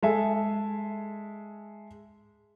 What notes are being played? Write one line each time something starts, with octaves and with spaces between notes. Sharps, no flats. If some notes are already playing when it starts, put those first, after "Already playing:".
G#3 A4 E5 G#5